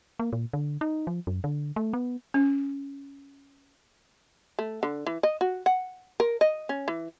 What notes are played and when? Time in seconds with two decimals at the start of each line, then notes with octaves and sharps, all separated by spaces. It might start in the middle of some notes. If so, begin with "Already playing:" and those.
0.19 A#3
0.33 A#2
0.53 D3
0.81 D#4
1.07 F3
1.27 F#2
1.44 D3
1.76 A3
1.93 B3
2.34 C#4
4.59 A3
4.83 D3
5.07 E3
5.23 D#5
5.41 F#4
5.66 F#5
6.20 A#4
6.41 D#5
6.69 C#4
6.88 E3